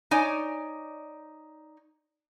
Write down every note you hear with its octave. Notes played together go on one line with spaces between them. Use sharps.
D#4 C#5 D5 G#5